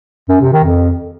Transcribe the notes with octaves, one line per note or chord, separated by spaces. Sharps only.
F#2
C3
D#3
F2